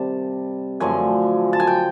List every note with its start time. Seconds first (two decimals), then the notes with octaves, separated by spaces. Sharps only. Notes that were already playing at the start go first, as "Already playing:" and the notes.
Already playing: C3 D#3 G3 A5
0.80 F#2 D3 F3 A3 G#5
1.53 A5
1.60 G#5
1.67 G5